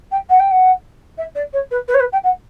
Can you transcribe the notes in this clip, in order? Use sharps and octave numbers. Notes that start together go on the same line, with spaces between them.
G5
F#5
G5
F#5
E5
D5
C#5
B4
B4
C#5
B4
G5
F#5